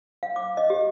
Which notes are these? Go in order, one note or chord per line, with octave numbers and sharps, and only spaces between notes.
F5
D6
D#5
G4